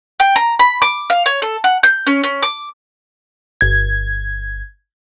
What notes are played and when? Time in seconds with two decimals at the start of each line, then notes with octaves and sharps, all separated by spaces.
0.20 G5
0.36 A#5
0.59 B5
0.82 D6
1.10 F5
1.26 C#5
1.42 A4
1.64 F#5
1.83 G6
2.07 C#4
2.23 C#4
2.43 D6
3.61 G1 G#6